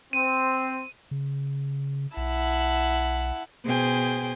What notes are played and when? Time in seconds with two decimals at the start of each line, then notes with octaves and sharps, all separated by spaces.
0.13 C4 D#7
1.11 C#3
2.17 B1 E4 F#5 A5
3.65 B2 G#4 C5 G5 G#5